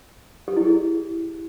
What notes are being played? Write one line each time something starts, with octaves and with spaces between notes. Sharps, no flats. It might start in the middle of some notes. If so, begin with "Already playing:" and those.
G4
E4
G#4